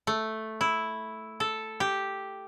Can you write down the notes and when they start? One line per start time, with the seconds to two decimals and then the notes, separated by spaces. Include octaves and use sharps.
0.07 A3
0.61 E4
1.40 A4
1.80 G4